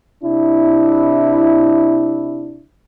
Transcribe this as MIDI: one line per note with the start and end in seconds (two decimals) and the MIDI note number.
0.24 2.63 48
0.24 2.63 62
0.24 2.63 64